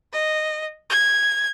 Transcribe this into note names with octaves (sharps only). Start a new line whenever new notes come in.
D#5
G#6